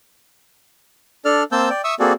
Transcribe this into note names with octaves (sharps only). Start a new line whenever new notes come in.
D4 A4 D5 F6
A#3 C4 C5 A5 E6 G6
D5 G5
E5 C#6 D#6 E6
A#3 C4 F#4 G#4 A4 D5